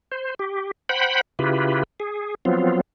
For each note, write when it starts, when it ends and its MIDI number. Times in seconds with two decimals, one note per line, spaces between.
0.12 0.34 72
0.39 0.71 67
0.89 1.21 72
0.89 1.21 78
0.89 1.21 79
0.89 1.21 83
1.39 1.83 49
1.39 1.83 64
1.39 1.83 65
1.39 1.83 67
1.39 1.83 71
2.00 2.35 68
2.45 2.81 53
2.45 2.81 54
2.45 2.81 59
2.45 2.81 60
2.45 2.81 65